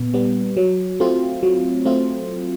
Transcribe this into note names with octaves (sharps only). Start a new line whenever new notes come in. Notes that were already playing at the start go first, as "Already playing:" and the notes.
Already playing: A#2 B3
G3 B3
F#3
A3 C4 F4
F#3
A3 C4 F4